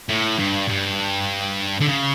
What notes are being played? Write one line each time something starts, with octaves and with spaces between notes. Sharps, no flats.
A2
G2
G2
D3
C#3